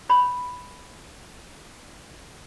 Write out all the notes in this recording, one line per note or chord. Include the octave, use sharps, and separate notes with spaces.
C#5 B5